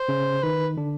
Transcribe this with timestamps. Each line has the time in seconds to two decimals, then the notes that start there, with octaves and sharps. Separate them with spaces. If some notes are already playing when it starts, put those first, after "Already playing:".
Already playing: C5
0.09 C#3 C#4
0.43 D#3 D#4 B4
0.77 D3 D4